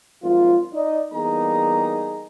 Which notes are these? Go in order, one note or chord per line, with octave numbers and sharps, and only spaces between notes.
G#1 A#2 F3 F#3 F4
D#4 D5 D#5
E2 G3 A#3 D#4 G#4 A#5